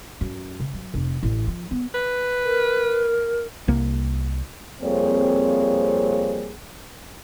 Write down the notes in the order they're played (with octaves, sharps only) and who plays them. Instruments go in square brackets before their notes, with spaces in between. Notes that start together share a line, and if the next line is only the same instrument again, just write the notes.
[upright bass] F#2
C#3
F#3
F1
A1
F3
B3
[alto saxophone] B4
[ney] A#4
[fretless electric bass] C2 A#3
[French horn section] F2 G3 A#3 C4 G#4 C#5